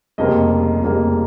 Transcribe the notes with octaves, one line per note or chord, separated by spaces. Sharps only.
F1 F2 C#3 G3 A#3 D#5
F1 F2 C#3 G3 A#3